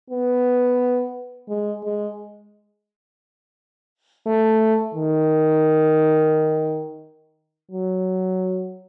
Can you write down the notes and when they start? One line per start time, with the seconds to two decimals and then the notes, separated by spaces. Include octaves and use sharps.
0.10 B3
1.49 G#3
1.84 G#3
4.26 A3
4.95 D#3
7.71 F#3